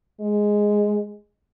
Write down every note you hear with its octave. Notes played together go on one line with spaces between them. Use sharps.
G#3